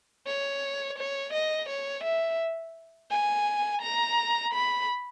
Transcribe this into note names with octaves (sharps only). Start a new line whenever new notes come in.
C#5
C#5
D#5
C#5
E5
G#5
A#5
B5